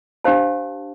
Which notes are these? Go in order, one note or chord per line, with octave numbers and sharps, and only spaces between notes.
D4 G4 C5 F5 A5